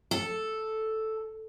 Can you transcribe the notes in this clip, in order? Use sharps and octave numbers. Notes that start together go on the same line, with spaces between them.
A4